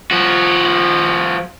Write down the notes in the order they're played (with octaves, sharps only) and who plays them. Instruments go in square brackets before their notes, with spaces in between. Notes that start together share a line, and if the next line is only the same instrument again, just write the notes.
[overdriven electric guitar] F3 F#4